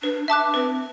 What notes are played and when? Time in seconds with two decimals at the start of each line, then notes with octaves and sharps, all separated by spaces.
0.02 D4 B4
0.28 E5 A5 D6 F#6
0.54 C4 B4